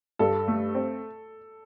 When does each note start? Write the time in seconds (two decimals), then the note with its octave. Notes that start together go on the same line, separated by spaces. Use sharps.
0.19 G2 A4
0.48 A3
0.75 C4